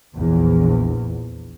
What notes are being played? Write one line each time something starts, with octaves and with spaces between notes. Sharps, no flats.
A#1 E2